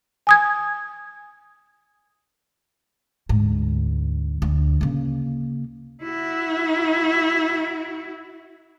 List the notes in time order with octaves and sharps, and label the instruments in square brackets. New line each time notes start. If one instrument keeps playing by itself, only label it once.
[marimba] G#5 D#6 G#6
[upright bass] D2 G#2
D2
C#3 A#3
[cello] E4 F#4